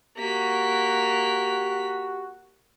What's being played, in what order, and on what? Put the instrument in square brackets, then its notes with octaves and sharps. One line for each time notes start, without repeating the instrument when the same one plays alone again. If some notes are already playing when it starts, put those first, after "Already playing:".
[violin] A#3 B6 [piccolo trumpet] F#4 [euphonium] G4